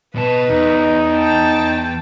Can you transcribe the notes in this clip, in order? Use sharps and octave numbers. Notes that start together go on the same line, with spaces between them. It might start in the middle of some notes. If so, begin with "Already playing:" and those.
B2 B4 D#5 A5
E2 D#4
G5 A5